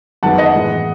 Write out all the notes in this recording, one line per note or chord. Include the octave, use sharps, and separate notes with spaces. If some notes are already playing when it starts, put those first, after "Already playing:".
F#2 D#3 G#3 B3 F#5 A5
D#5 F#5
A2 E3 G#3 B3